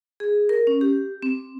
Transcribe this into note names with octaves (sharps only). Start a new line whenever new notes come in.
G#4
A#4
C#4
G4
C4